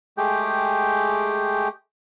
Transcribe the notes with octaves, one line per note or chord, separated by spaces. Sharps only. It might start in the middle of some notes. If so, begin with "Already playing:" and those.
G#3 A3 G4 G#4 G5